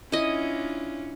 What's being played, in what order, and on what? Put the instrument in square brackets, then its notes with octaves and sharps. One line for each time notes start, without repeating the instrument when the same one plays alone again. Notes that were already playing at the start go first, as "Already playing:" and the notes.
[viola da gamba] C#4 D4 F4 [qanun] E4 D#5